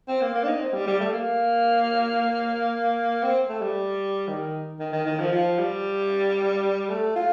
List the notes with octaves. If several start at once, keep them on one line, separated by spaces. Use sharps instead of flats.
C4
A#3
A#3
D4
D#4
C4
G3
G3
A3
A#3
C4
A3
G3
D#3
D#3
D#3
D#3
F3
F3
G3
A3
F4